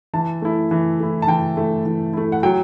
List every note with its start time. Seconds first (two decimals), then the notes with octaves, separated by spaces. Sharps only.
0.14 E3 A5
0.42 A3 E4
0.71 E3
1.00 A3 E4
1.22 A5
1.27 E3 G5
1.57 A3 E4
1.86 E3
2.13 A3 E4
2.32 F#5
2.43 F#3 G5